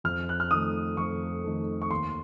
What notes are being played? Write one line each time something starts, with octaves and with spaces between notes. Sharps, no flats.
F2 F6
F#6
F6
D#3 A3 D#6
F2 C#6
D#3 A3
C#6
D#2 C6